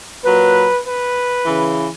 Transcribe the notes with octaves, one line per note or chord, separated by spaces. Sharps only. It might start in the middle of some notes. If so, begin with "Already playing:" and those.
A#2 F#3 B4
B4
C#3 E3